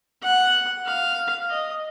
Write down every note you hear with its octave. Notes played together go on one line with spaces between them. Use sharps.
F#5
F5
D#5